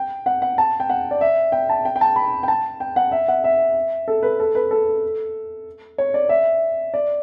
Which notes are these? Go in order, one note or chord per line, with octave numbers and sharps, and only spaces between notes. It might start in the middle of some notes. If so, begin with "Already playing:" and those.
Already playing: G5
F#5
F#5
A5
G5
F#5
D5
E5
G5
A5
G5
G5
A5
B5
G5
A5
G5
F#5
E5
F#5
E5
A4
B4
A4
B4
A4
C#5
D5
E5
D5